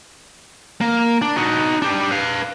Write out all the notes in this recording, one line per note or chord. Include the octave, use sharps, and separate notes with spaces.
A#3
D4
D#4 F#4
D4 G4
B4 F5